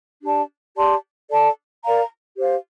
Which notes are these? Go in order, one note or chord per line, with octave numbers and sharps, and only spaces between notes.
D4 G4 D5 A5
G4 D5 A5 C6
A4 D5 A5
A#4 D5 F5 A#5
G4 C5 F5